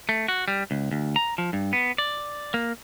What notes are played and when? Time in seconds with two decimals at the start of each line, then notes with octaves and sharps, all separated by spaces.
0.09 A3
0.28 F#4
0.48 G3
0.71 C#2
0.91 D2
1.16 A#5
1.38 F3
1.53 G2
1.73 B3
1.98 D5
2.54 A#3